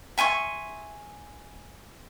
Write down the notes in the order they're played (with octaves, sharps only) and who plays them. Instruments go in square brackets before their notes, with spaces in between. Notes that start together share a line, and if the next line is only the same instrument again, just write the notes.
[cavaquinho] E5 G#5 C6 C#6